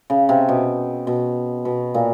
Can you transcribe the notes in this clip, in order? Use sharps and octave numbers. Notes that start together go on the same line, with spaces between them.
C#3
C3
B2
B2
B2
A#2